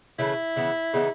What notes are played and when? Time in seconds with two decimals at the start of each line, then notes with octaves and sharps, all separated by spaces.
0.19 C#3 E3 A3 C#4 E4
0.56 C#3 E3 B3
0.94 C#3 E3 B3 D#4